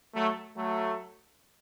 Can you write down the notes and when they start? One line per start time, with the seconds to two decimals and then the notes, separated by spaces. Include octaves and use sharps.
0.15 F#3 A3
0.56 F#3 A3